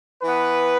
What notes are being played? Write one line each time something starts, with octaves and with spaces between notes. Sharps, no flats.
E3 B3 B4